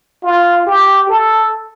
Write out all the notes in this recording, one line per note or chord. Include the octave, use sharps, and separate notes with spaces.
F4
G4
A4